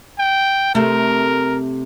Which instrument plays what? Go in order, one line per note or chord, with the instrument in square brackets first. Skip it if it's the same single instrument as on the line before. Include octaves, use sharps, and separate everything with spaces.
[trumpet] G5
[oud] C3 A3 [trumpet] A#4